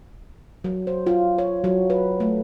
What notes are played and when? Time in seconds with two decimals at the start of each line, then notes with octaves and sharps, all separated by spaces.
0.64 F#3
0.87 C5
1.07 F4
1.38 C#5
1.64 F#3
1.90 B4
2.20 A3